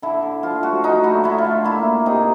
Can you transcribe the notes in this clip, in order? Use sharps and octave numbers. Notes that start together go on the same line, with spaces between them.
D3 E4
D3
F3 F4
A3 F#4
D3 D#4
A3 E4
A3 E4
F4
D3
A#3 E4
A#3
C3 D#4